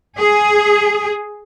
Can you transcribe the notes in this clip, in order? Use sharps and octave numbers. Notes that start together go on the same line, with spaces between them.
G#4